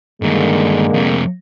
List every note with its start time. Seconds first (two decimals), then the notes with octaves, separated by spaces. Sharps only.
0.22 G2 D3 D#3 G#3 A#3
0.94 F2 C3